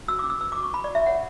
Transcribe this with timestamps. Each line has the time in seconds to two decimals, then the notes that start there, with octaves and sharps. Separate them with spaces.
0.08 F#4 E6
0.19 D6
0.24 C#4
0.30 E6
0.41 B4 E6
0.52 D6
0.57 F#4
0.63 C#6
0.73 F#4 B5
0.84 D5
0.91 F#4 E5
1.06 C#5 F#5